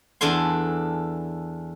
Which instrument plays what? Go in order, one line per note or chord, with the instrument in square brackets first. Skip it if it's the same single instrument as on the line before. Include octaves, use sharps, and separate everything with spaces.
[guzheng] E2 D4 A4 G#5 C6